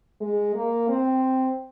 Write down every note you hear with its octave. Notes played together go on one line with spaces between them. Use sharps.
G#3
A#3
C4